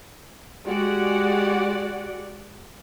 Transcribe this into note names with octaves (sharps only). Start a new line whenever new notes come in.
G#3 F#4 G4 D5 F#5